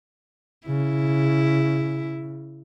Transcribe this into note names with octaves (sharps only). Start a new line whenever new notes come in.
C#3 E4